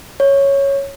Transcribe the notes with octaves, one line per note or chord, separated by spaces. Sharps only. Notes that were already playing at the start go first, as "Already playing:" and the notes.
C#5